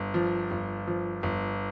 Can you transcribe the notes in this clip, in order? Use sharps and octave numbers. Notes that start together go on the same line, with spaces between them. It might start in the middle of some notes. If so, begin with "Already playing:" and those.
Already playing: G1
F3
G1
F3
G1